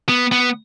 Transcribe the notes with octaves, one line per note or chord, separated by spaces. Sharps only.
B3
B3